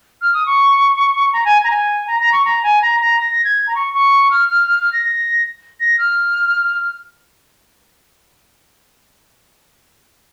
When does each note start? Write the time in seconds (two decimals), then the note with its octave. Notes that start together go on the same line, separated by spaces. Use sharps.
0.21 F6
0.34 D#6
0.46 C#6
1.33 A#5
1.45 G#5
1.64 A#5
1.70 G#5
2.07 A#5
2.20 A#5
2.32 C#6
2.45 A#5
2.63 G#5
2.82 A#5
3.00 A#5
3.19 A#6
3.32 A#6
3.44 G#6
3.67 A#5
3.75 C#6
3.94 C#6
4.31 F6
4.49 F6
4.67 F6
4.80 F6
4.93 A#6
5.05 A#6
5.80 A#6
5.98 F6